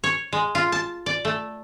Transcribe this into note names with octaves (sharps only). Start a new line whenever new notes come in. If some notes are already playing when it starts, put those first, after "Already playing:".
C#5
G#3
F4
A5
D5
A3